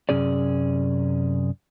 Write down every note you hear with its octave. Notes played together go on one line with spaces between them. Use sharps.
F#2 C3 C#4 G#4 D5